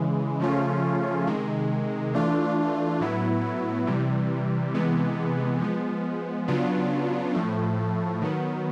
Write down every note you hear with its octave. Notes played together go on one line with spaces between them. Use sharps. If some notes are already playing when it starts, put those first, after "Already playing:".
Already playing: C#3 E3 G#3
C#3 F3 A3 C#4 F4
C3 D#3 G#3
E3 A3 D4 F4
A2 F#3 B3 E4
C3 E3 G3
C3 E3 G#3 B3
F3 G#3 B3
C#3 F#3 B3 D4 F4
A2 F3 A3
D#3 F#3 B3